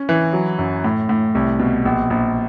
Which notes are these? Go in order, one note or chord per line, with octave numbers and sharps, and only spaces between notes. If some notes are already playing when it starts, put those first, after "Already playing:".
Already playing: C#4
E3
F#3
F#2
A2
A2
C2
B2
A#1
A#1